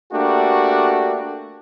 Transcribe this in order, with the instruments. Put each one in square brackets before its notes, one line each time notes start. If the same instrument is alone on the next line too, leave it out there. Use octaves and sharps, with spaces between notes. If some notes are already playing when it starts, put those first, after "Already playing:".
[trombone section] A3 A#3 D4 F#4 G4